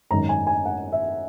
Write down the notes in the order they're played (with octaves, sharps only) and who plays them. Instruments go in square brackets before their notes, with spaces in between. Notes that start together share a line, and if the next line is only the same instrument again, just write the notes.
[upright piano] G#1 F#2 D#3 A#5
G#5
G#5
F#5
E5